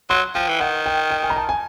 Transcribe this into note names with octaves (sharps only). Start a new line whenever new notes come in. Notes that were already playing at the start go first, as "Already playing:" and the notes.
F#3 C6
F3 G5
E3
D#3 F#5
G5
G5
G#5
A#5
A5
G#5